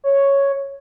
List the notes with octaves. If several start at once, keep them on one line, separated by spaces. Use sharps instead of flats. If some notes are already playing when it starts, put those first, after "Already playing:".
C#5